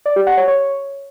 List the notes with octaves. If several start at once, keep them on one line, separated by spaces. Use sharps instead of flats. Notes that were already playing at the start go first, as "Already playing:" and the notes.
D5
G4
F#5
C#5
C#5